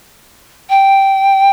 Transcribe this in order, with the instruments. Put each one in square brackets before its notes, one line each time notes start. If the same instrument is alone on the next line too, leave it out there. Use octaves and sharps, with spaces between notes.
[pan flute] G5